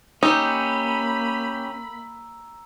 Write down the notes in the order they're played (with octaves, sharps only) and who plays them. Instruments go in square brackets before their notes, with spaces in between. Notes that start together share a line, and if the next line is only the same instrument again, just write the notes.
[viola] A#3 B5 [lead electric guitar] C#4 G4 [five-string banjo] D#4 [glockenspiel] A#5 E6